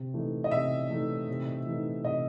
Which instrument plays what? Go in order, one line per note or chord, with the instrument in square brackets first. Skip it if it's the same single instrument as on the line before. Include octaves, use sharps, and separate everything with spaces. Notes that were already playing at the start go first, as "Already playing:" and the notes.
Already playing: [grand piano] C3
E3 A3 D#4
[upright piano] D#5
[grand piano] C3 [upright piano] E5
[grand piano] E3 A3 D#4
C3
E3 A3 D#4
[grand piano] C3 [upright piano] D#5